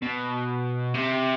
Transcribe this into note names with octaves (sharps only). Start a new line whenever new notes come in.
B2
C3